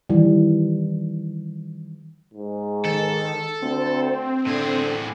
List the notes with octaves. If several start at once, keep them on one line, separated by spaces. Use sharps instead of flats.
D#3 E3 G3
G#2
D#3 A4
D2 C4
A2 D3 G#4